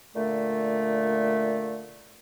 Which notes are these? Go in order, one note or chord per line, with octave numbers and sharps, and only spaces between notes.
A#2 D3 A3